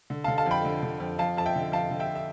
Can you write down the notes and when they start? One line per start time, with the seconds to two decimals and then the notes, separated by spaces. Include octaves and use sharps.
0.10 D3
0.24 F5 A5
0.28 D3
0.38 F5 A5
0.46 F2 G5 B5
0.65 D3
0.83 D3
1.00 F2
1.19 F2 F5 A5
1.37 F2 A5
1.45 E5 G5
1.55 D3
1.72 F2 F5 A5
1.90 D3
2.00 E5 G5
2.15 E5